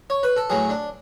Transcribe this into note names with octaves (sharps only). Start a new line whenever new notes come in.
C#5
B4
A4
A2 F#3 G#4
D4